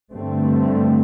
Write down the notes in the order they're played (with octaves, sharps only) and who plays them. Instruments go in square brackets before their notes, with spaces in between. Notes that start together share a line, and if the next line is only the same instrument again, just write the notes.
[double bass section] G2 D3 A3 C4